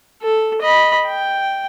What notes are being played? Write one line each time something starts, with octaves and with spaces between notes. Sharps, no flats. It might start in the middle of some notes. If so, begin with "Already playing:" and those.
A4
D#5 B5
G5